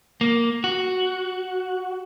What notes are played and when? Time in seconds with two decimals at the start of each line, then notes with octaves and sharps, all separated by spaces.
0.21 A#3
0.64 F#4